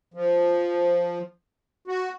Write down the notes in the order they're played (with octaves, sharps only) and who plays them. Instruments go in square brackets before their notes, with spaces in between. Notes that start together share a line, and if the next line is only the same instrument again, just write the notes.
[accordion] F3
F#4